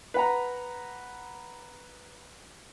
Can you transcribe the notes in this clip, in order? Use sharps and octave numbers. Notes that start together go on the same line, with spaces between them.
B4 F#5 A#5